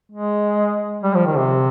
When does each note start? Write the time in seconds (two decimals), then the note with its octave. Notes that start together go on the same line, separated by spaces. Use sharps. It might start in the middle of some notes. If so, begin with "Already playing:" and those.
0.12 G#3
1.03 G3
1.14 F3
1.26 D#3
1.37 C3